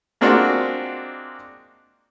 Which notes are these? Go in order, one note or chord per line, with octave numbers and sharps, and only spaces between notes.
G#3 A#3 C4 D4 F4 F#4